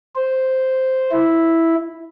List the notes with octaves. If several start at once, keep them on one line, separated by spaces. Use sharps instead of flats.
C5
E4